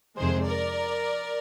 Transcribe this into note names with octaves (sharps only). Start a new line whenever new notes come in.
F2 C3 D#3 G#3 G#4 C5
A#4 D5